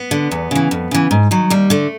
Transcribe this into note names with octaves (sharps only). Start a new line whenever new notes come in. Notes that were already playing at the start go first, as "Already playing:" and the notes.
Already playing: B3
D3
E2
C#3 E3
F2
C#3 E3
G#2
D#3 F#3
D#2 G3
D3 A3